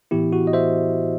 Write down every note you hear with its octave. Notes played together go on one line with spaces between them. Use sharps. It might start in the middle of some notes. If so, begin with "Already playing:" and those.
A2 E3 B3 E4 G4
F#4
D#5
C5 E5